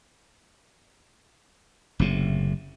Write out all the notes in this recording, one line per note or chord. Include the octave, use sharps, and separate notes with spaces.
F#1 A2 C3